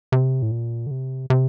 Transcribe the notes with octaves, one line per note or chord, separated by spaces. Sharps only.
C3
A2
A#2
D3
C3
C3